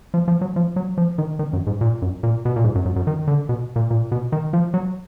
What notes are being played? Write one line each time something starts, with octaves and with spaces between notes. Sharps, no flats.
F3
F3
F#3
F3
F#3
F3
D#3
D#3
F#2
G#2
A#2
F#2
A#2
B2
A#2
G#2
F#2
F#2
F#2
D#3
D3
B2
A#2
A#2
B2
D#3
F3
F#3